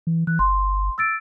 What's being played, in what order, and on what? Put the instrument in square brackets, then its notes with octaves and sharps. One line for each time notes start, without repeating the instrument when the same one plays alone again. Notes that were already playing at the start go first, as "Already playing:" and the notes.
[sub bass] E3
[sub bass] E3 [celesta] F#6
[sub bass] G1 [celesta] C6
[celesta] E6 A6 D7